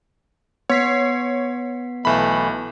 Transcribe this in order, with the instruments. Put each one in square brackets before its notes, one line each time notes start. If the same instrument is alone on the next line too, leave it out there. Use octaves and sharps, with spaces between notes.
[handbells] B3 B6 C7 [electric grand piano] C#5
[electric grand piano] B1 B5 [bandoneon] E3 A3